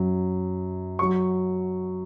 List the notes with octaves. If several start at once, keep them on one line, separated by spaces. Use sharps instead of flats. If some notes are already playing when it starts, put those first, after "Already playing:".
Already playing: F#2 F#3
F#3 C#6